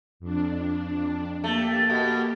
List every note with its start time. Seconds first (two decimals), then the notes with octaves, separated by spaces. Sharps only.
0.20 F2 D4
1.44 A3 A#3 G4
1.90 B2